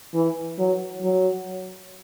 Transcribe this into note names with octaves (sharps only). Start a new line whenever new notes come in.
E3
F#3
F#3